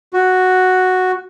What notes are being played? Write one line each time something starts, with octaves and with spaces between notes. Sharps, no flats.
F#4